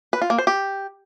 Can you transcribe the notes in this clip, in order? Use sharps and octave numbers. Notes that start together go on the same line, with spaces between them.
B4
F4
A#3
C5
G4